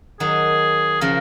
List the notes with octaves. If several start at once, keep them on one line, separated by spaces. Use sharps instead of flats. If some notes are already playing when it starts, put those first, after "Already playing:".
D#3 F#3 G#4
C#3 F3 A#4